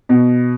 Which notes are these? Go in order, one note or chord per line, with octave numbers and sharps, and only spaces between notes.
B2